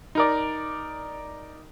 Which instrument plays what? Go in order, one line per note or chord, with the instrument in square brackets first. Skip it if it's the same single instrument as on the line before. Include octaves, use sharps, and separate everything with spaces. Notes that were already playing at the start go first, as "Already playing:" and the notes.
[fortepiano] D#4 A#4 D5